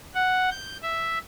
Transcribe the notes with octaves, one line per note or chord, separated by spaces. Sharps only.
F#5
G6
E5